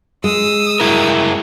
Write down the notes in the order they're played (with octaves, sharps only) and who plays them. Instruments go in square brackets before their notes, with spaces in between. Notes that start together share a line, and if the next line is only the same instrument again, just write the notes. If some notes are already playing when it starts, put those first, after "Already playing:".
[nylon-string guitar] G#3 [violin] D#6 E6
[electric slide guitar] F#2 E4 A#4